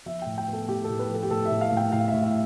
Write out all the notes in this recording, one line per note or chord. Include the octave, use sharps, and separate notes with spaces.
F3 E5
A2 G5
G5
B3
A4
A2 G4
A4
A2
B4
F3 A4
G4
A2 A4
E5
A2
F5
A2 G5
A2 F5
E5
A2
E5